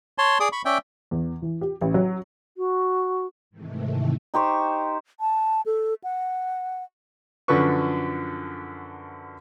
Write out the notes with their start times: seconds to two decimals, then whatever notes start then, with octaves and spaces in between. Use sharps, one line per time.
0.18 C#5 A5 C6
0.40 G#4 D5 D#6
0.52 B5 C#6
0.65 C#4 D5 E5 G5
1.11 E2
1.42 E3
1.61 G4
1.81 A1
1.94 F#3
2.57 F#4
3.51 G#2 C3 D#3 E3 A3
4.34 D#4 G4 C5 C#6
5.20 A5
5.66 A4
6.04 F#5
7.48 F#2 D3 F3 A4 B4 C#6